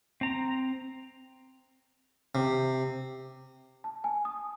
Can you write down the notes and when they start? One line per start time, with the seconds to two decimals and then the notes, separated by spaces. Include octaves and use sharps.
0.21 C4 A#5
2.35 C3
3.84 A5
4.04 G#5
4.25 D#6